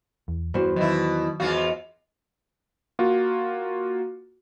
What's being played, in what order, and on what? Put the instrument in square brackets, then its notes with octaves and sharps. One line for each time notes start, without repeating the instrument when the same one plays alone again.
[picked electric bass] E2
[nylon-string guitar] E2 F#4 C5 [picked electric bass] G2 E3
[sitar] B2 E4 [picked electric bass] D#3 F#3
[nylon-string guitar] E2 F5 [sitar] G#2 F4 F#4
[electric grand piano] A#3 F4 F#4